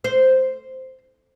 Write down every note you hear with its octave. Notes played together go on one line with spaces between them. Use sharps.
C5